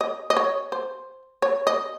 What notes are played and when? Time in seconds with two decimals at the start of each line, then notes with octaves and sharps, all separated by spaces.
0.01 D#5
0.30 D#5
0.37 C#5
0.72 C5
1.42 C#5
1.67 D#5